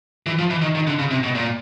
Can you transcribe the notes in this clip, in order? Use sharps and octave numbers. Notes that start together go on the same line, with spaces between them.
E3
F3
E3
D#3
D#3
D3
C#3
C3
B2
A#2